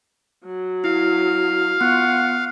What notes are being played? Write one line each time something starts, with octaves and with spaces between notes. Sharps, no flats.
F#3
E4 F5
B3 F4 F#5 C#6